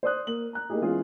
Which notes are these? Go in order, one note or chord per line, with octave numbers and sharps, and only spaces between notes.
C5 D5 D#6 F#6
A#3 F#7
A#5 F#6
A#3 D#4 E4 G4 G#4
E3 G#3 B3 C#4 F4 G#4